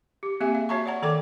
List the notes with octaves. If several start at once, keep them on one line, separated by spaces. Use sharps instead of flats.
G4
A#3 C4 G4 G#4 E5 G#5
E5
F#4 C#5 E5 A5 A#5 C#6
C#5 D5 F#5 A#5
D#3 A4 D5 G5 D6